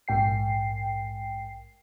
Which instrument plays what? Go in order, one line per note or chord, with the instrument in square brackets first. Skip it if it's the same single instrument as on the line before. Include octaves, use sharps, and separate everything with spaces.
[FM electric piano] A#1 G#2 G5 C7